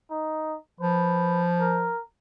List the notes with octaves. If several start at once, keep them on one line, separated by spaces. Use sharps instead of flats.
D#4
F3 B4
A#4